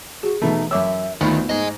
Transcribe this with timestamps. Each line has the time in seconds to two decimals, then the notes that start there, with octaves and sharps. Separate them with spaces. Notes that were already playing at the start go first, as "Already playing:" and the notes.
0.23 F#4 G#4
0.42 B2 E3 A3 D#4
0.71 F#2 C#5 E5 D6 E6
1.21 D2 D#3 A3 B3 D#4 F4 B5
1.49 G#2 G#4 D#5